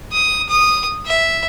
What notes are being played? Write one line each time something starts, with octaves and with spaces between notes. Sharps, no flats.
D#6
D#6
E5